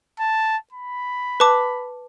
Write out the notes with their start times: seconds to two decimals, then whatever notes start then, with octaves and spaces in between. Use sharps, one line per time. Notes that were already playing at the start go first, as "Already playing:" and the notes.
0.20 A5
0.73 B5
1.40 B4 A5 D6